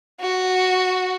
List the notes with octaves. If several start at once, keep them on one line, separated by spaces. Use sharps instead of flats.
F#4